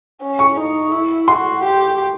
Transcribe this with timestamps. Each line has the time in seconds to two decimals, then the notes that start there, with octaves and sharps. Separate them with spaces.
0.21 C#4
0.39 C#6
0.57 D#4
0.92 E4
1.28 F#4 C6
1.63 G4